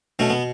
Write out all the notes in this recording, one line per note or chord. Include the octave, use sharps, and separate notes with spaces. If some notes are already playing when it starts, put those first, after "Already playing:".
B2 A3 C#4
B3